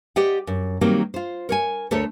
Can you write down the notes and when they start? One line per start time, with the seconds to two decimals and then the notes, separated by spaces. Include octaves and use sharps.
0.16 G4 C5 D5 D#5 F#5 G5
0.47 F#2
0.81 D#3 F#3 G3 A#3 C4
1.14 F4 C5
1.49 A#4 C#5 G#5
1.91 D2 A3 A4 A#4 C5 C#5